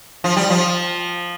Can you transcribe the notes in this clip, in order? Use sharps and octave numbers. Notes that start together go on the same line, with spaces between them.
F3
G3
F3